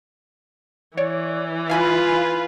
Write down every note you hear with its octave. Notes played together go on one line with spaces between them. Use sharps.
E3 C#5 D5
F4 B4 F5 G#5 B5